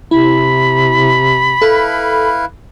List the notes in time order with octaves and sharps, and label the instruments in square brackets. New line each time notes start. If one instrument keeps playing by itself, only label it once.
[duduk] C3 [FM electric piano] E4 [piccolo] B5
[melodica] E4 B4 F5 [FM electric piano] A4